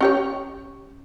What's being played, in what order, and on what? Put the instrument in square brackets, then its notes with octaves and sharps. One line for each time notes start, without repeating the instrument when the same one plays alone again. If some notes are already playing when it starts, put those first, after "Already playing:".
[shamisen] C#4 G4 C#5